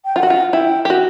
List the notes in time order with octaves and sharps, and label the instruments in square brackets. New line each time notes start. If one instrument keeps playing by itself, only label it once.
[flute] G5
[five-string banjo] F4 [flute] F#5
[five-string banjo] F#4
F4
[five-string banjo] E4 [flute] G5
[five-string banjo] G4
F#4